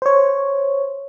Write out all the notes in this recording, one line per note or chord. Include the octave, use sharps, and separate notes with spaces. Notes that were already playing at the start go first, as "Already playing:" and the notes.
C5 C#5